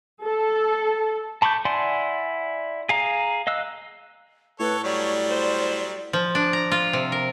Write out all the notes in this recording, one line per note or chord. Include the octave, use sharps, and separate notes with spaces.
A4
A5 B5 C#6 D6 G6
E4 D5 F#5 G#5 C6
G#4 F5 A#5
D#5 F5 E6 F#6
A2 A4 B4 C#5
F#3 G3 C#5 D5
C5
F3
D4
A#5
F4
C3
A#4